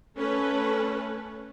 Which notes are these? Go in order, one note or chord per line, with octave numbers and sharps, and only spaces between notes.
A3 C#4 A4 B4